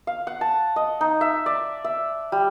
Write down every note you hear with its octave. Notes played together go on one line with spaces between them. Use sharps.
F5
F#5
A5
D#5
D#4
E5
D5
E5
G3